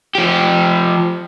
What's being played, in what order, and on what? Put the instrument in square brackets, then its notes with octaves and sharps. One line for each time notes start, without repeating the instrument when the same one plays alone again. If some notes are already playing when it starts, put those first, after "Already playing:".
[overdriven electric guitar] F3 G4